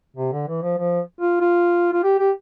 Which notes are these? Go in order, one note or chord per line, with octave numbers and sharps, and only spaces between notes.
C3
D3
E3
F3
F3
F4
F4
F4
G4
G4